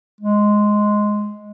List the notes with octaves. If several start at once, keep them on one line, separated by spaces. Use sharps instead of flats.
G#3